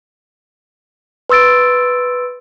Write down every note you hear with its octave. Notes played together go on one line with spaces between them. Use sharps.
B4 C6 E6 A6 D7